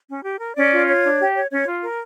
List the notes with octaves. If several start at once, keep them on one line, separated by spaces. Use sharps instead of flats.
C#4
G4
A#4
C#4 D5
F4
C#5
D4
G4
C#5
C#4 C#5
F4
A#4